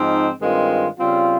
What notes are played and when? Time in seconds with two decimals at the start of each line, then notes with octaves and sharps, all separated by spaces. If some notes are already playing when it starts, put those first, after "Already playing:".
Already playing: G#2 F3 C4 D#4
0.41 G2 D#3 G#3 C4 F4
0.98 C#3 G3 C4 F4